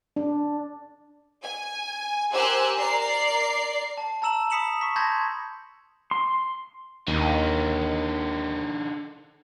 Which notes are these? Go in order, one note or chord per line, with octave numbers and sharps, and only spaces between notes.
D4
G#5
G4 A#4 C5 G#5 E6 F#6
A#4 D5 C7
A5
A5 A#5 E6 E7 F#7
B5 D#6 B6 C#7 E7 F#7
C#6 B6
A5 B5 C6 G6 G#6 A#6
C6
D#2 D3 D#4